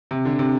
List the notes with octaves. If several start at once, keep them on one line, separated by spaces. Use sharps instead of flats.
C3
D3
C3